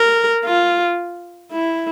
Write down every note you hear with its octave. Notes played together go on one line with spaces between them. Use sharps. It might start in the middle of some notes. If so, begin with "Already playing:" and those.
Already playing: A#4
F4
E4